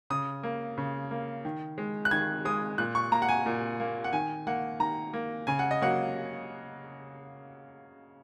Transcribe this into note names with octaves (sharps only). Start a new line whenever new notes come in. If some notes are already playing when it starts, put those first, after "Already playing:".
C#3 D#6
A#3
C#3
A#3
D#3
G#3
F#6
D#3 G#6
G#3 D#6
A#2 F#6
C#6
A#3 A#5
F#5
G#5
A#2
A#3
F#5
D#3 G#5
A#3 F#5
D#3 A#5
A#3
C#3 G#5
F#5
D#5
F#3 A#3 F#5